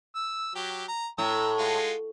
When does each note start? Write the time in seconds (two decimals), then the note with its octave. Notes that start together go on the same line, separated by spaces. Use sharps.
0.15 E6
0.55 F#3 G4
0.88 A#5
1.18 A2 A#5 E6
1.58 G#3 F4 F#5